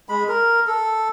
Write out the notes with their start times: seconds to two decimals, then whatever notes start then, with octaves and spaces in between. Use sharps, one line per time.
0.09 G#3 B5
0.28 A#4
0.67 A4